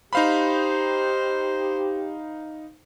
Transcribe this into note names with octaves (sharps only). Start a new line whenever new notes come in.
D#4 G4 C5 F5 B5